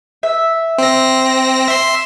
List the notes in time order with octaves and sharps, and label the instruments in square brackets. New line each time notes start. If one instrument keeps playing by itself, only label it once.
[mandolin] E5
[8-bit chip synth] C4 A#6
E5 C6